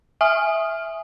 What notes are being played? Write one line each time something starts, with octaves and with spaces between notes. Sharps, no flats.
E5 G#5 D#6 F6